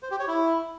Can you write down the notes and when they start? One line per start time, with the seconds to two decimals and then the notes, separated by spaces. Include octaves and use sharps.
0.03 C5
0.11 G4
0.19 C#5
0.28 E4